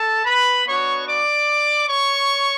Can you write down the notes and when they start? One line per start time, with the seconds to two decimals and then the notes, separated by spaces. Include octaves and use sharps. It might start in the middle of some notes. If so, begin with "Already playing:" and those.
Already playing: A4 A5
0.25 B4 B5
0.66 B3 D4 F#4 C#5 C#6
1.07 D5 D6
1.87 C#5 C#6